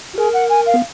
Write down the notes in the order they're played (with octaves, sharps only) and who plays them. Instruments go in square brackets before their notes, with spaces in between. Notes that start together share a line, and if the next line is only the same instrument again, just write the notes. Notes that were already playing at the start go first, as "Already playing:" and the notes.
[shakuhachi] F#4
[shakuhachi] G#4 [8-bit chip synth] A#4
[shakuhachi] F#5
G#5
F5
[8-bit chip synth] B3